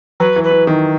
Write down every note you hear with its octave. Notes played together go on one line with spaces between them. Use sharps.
F#3 B4
E3
B4
E3
D#3